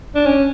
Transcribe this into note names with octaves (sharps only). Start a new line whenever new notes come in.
D4
C#4